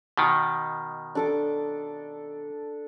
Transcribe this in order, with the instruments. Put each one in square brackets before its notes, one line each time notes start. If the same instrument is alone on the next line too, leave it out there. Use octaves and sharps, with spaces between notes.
[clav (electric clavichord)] B2 D#3
[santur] D4 A4 D6